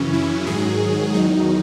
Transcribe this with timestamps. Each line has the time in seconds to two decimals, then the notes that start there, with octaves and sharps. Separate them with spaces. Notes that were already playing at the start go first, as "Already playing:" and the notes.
Already playing: F#2 C#3 E3 C#4
0.13 E4
0.47 G#2 D#3 F#3 G#4
1.14 E2 D#3 F#3 D#4